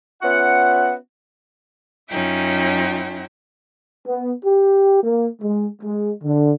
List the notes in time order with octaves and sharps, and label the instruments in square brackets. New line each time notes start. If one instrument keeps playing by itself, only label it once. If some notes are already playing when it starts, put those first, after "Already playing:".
[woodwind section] B3 C#4 F4 E5 F#5
[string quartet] F#2 C#4 D#4 F4 E5 G5
[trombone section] B3
G4
A#3
G#3
G#3
D3